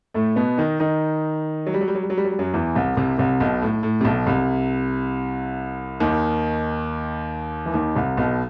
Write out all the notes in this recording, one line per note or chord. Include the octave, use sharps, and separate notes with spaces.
A2 A3
B2 B3
D#3 D#4
D#3 D#4
F#3
G3
F#3
G3
F#3
G3
F#3
G3
F#3
G3
F#2 F#3
E2 E3
C2 C3
C2 C3
C2 C3
B1 B2
A2
A2
C3
B1 B2
C2 C3
D#2 D#3
E3
D#2 D#3
C2 C3
B1 B2